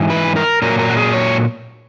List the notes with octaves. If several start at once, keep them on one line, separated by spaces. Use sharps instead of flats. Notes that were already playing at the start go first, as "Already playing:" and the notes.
Already playing: G#2 E3
B4
A#4
A#2 F#3 A#4
A#4
F#4
G#4
C#5